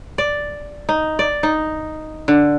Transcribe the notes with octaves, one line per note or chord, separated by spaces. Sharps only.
D5
D#4
D5
D#4
D3